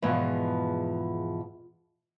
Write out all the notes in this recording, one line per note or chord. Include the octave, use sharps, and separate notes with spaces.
E2 G#2 B2 F3